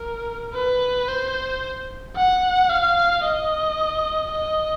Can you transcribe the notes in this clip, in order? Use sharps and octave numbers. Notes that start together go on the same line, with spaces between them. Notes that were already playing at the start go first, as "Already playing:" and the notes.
Already playing: A#4
B4
C5
F#5
F5
D#5
D#5